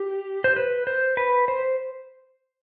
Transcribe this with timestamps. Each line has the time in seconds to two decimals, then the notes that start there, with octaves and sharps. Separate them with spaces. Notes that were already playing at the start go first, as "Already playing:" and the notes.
Already playing: G4
0.44 C5
0.56 B4
0.87 C5
1.17 B4
1.48 C5